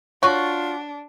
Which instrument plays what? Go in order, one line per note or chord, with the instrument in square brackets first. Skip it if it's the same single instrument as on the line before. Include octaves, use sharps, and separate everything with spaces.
[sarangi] D4 [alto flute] F4 [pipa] F#4 [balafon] C#5 C#6